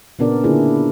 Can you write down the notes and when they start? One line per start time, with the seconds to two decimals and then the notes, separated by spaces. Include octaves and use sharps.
0.19 A#2 C#3 B3 D4 A#4 D5
0.44 D3 A#3 D4 E4 F4 G#4